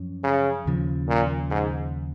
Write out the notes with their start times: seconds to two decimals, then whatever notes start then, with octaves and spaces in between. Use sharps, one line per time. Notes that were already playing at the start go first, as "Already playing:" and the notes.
Already playing: F#2 F3 C#4
0.23 C#3
0.66 D#2 C#3 F3
1.08 A#2
1.51 G#2